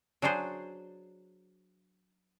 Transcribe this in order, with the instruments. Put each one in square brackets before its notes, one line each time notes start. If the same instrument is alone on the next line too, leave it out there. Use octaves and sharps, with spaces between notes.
[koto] F#3 D4 F#4 G#4 C5